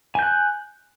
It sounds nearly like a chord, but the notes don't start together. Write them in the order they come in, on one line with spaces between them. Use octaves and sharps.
G#5 G6 F#6